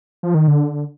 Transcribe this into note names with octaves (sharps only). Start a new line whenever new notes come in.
F3
D#3
D3